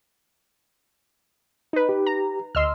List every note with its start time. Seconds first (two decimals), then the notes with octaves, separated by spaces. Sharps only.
1.73 D#4 B4
1.89 G4
2.06 A#5
2.55 D2 D#5 C6 E6 F6